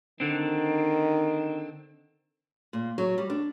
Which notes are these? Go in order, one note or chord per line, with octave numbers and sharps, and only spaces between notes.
D3 D#3 C4
A#2
F#3
G3
D4